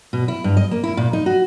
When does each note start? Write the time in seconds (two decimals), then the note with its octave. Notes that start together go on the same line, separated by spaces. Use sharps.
0.13 B2
0.28 E4
0.44 G2
0.57 D#5
0.71 A#3
0.84 E4
0.97 A#2
1.13 D#4
1.26 F#4